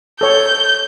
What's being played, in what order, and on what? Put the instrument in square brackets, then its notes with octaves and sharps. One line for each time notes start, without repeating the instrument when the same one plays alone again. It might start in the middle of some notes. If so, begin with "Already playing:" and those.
[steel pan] A4 C#5 [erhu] G6